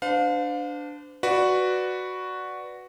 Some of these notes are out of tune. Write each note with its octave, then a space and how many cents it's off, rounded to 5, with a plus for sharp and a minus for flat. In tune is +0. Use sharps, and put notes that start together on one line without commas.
D4 +0 C5 -40 F5 +30
F#4 +0 B4 +0 D5 +0